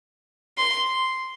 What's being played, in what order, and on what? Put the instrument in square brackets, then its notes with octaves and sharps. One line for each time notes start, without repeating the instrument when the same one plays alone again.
[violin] C6